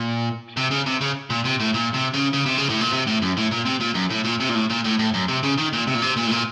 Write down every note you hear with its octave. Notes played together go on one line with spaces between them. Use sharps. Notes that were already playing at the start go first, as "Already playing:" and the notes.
Already playing: A#2
C3
C#3
C3
C#3
A#2
C3
A2
A#2
C3
C#3
C#3
C3
C#3
A2
A#2
C3
A2
F#2
A2
A#2
C3
A#2
F#2
A2
A#2
C3
A#2
A2
A#2
A2
A2
F#2
C3
C#3
D#3
A#2
C3
A#2
C3
A#2
A2
A#2